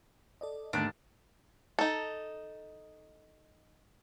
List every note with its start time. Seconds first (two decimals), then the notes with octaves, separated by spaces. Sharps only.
0.41 A4 D5 D#5
0.73 D#2 G#2 D3 A3 D4
1.79 D#4 A4